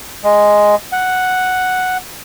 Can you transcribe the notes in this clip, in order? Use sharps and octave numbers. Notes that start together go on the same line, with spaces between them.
G#3
F#5